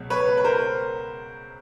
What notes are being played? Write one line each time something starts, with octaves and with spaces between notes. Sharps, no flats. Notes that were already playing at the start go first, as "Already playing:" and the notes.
Already playing: C#2 B2 F#3
B4 C#5
B4
A#4 C5